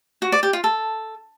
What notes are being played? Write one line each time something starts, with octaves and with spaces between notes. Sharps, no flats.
F#4
D5
G4
F4
A4